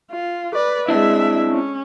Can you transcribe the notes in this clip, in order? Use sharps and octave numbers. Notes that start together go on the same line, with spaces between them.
F4
B4 D5
G#3 C4 D4 E4 E5
C#4